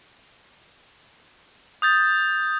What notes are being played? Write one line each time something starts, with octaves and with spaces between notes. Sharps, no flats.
D#6 G6 A6